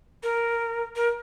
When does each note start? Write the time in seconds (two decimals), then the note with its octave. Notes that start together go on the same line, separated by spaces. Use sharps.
0.23 A#4
0.96 A#4